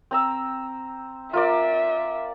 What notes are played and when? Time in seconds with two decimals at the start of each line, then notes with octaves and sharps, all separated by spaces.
0.11 C4 A#5 E6
1.33 F4 A#4 D5 E5